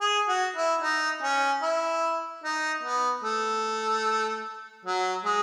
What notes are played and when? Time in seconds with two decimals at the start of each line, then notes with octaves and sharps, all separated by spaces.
0.01 G#4
0.29 F#4
0.56 E4
0.82 D#4
1.23 C#4
1.62 E4
2.44 D#4
2.83 B3
3.24 A3
4.85 F#3
5.25 G#3